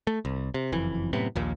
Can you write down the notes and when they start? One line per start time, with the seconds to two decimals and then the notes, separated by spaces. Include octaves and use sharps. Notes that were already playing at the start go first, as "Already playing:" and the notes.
0.07 A3
0.25 C2
0.54 C3
0.72 F#1 F2 E3
1.13 F#2 A2 C3 B3
1.36 A#1 D#2 A#2